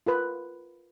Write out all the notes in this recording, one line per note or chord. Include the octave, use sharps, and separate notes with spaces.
F4 A#4 B4